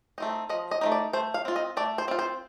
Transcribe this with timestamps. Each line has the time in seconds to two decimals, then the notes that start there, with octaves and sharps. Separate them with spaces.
0.18 A3 C4 D#4
0.49 F3 D#5
0.71 D#5
0.81 A3 C4 D#4
0.92 D5
1.13 A3 C5
1.34 F5
1.45 C4 F4
1.56 D#5
1.77 A3 D5
1.98 C5
2.08 C4 F4
2.19 C5